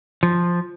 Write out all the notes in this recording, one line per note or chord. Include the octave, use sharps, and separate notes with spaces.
F3